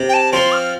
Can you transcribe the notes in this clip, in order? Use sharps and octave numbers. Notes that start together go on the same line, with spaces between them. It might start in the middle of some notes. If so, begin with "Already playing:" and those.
Already playing: C3
G5
A5
F3 C4 F4 C6
F6